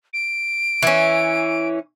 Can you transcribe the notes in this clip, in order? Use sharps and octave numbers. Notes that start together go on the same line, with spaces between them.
D7
E3 C#4